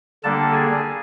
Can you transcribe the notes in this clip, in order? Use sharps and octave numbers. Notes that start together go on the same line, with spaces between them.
D3 G3 A#3 D4 A4 A5
G#4 G#5